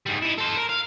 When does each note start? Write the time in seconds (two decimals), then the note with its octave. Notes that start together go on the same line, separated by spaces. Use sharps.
0.06 G#2 G3
0.22 D#4 E4
0.38 A4 C5
0.57 A#4
0.69 F5